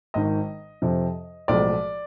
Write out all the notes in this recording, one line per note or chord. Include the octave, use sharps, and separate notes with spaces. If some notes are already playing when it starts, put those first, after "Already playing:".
G#1 G#2 D#3 D#5
F2 C3 F3
B1 A2 F3 G#3 D5